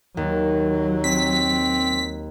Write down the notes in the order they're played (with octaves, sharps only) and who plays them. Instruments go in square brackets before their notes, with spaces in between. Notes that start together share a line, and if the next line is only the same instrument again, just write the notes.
[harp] D#2 [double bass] F#3
[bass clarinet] C4 [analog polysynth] B6